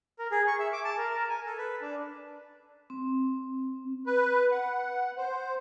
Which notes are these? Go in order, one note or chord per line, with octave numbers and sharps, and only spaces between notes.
A#4
G#4
C#6
E5
D6
A5
A#4
A#4
G#5
A4
B4
D4
C4
B4
F#5
C5